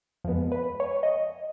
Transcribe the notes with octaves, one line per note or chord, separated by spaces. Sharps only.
F2 F3 G#3 B3
B4
C#5
D#5